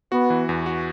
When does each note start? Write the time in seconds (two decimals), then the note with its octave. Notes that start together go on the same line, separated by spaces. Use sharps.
0.12 B3 F#4
0.30 E3
0.49 E2
0.66 F#4